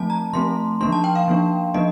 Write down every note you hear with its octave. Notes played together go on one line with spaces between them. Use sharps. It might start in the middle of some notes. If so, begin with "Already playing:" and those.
Already playing: F3 A3 C4 A5
A#5
F3 A3 C4 C6
F3 A#3 D4 C6
A5
G5
F5
F3 A#3 D4
F3 A#3 D4 D#5